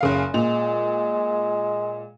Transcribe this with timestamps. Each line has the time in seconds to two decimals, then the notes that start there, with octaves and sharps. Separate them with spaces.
0.01 F#1 C#3 F5
0.34 A#2 G#3 F7